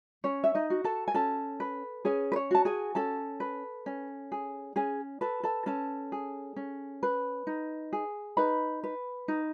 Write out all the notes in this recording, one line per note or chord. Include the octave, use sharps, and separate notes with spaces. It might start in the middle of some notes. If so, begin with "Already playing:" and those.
C#4 C#5
E5
D#4 D#5
F#4
A4 A5
G#5
C#4 A4 A5
B4
C#4 G#4 G#5
B4
C#5
F#4 A5
G#4 G#5
C#4 A4 A5
B4
C#4
G#4
C#4 G#4 G#5
A4 B4 A5
A4 A5
C#4 A4 A5
G#4
C#4
B4
D#4
G#4
D#4 B4 B5
B4
D#4